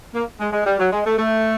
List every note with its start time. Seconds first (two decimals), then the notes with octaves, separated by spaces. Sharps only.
0.14 A#3
0.40 G#3
0.53 G#3
0.66 G3
0.79 F#3
0.92 G#3
1.06 A3
1.18 A3